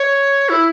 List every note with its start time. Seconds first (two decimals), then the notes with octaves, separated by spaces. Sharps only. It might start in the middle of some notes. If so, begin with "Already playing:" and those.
Already playing: C#5
0.49 E4